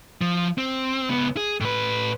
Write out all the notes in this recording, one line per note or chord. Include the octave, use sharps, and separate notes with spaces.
F3
C4
C#2 B3
G#4
A2 B4